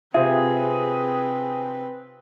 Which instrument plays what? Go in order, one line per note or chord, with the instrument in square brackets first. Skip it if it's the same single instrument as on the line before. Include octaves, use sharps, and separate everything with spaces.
[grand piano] C3 F4 [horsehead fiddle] C4 B4 [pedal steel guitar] G#4 [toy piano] E5